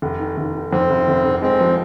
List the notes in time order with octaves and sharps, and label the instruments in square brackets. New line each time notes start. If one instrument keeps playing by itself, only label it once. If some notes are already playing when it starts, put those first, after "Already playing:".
[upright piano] F1
D#3
F1
D#3
[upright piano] F2 [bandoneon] C4
[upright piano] F1
F1
F1
[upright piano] G#3 [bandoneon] C4
[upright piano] F3